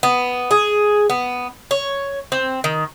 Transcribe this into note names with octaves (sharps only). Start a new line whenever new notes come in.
B3
G#4
B3
C#5
C4
D#3